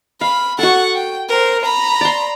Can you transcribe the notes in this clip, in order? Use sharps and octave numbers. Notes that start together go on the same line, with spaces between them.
F5 B5
F#4 A4 F#5 C#6
G5
A#4 C5
A#5 B5
D5 C6